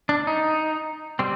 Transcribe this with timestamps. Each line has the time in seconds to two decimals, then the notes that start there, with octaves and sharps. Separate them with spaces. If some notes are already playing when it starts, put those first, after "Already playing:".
0.09 D4
0.27 D#4
1.19 G3 C4